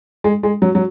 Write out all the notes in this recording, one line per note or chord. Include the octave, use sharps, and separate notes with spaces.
G#3
G#3
F#3
F#3